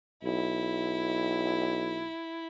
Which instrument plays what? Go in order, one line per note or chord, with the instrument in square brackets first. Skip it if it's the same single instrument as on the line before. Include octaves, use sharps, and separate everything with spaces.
[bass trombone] B1 [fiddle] E4